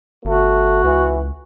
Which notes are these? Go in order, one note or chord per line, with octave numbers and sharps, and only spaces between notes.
G1 A3 F#4
C#2 E3